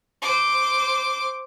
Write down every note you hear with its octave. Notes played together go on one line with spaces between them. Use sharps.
C5 D6